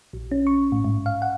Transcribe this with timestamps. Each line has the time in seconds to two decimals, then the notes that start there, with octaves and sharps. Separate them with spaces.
0.13 A#1
0.31 C#4
0.47 C#6
0.72 A2
0.84 G#2
1.06 F5
1.22 F#5